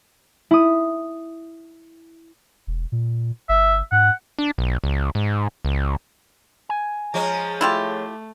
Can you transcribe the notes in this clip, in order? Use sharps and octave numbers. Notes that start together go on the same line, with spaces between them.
E4 D#6
E1
A#2
G1 E5
G#2 F#5
D4
B1
C#2
G#2
C#2
G#5
F3 G#3 C#4 A#5
A3 E4 F4 G4